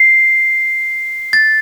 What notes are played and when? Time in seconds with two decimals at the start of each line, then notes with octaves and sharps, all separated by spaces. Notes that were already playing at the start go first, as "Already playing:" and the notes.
Already playing: C7
1.33 A6